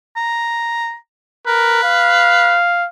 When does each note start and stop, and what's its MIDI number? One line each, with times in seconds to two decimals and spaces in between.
0.16 0.95 82
1.47 1.81 70
1.47 2.55 71
1.84 2.87 77